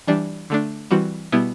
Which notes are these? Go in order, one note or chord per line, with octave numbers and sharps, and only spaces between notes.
E3 G3 D4
D3 A3 D4
E3 G3 C4 F#4
B2 G3 B3 E4